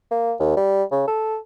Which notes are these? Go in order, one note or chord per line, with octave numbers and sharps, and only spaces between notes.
A#3
D#2
G3
C#3
A4